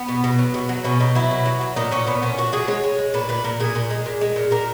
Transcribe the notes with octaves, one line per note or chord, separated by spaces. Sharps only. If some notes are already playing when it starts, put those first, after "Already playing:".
Already playing: B3
B2
B2
F#3
B2
F#3
B2 C#4
B2 D#4
F#3 E4
B2
F#3
F#3
A#2 D#4
A#2 C#4
A#2 B3
A#2 C#4
A#2 F#4
F#3 G#4
G#3 C#5
G#3
G#3
A#2 B4
A#2 B4
A#2 A#4
A#2 G#4
A#2
G#3
A#2
G#3
A#2
A#2 A#4